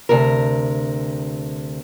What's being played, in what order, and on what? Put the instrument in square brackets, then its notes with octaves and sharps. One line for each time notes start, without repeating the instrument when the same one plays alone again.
[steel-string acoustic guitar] D2 C3 A#4